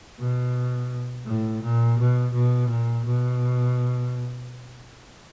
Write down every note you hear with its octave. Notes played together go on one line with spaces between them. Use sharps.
B2
A2
A#2
B2
B2
A#2
B2